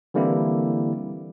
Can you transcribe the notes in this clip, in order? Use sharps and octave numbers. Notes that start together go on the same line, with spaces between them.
D3 E3 G3 A#3 C4 E4